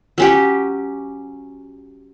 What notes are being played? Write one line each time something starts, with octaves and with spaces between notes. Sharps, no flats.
F#3 C#4 G4